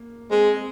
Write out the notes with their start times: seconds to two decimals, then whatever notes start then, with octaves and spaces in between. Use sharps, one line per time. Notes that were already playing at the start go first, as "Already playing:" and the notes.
Already playing: A#3
0.31 G#3 C4